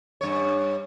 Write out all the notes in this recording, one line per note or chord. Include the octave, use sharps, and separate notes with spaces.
G2 C#5